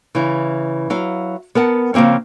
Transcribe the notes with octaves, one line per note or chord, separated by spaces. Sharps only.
C#3 E3 E4
F#3 E4 F5
B3 A#4 F#5 A5
C#3 F3 A#3 C4 C#4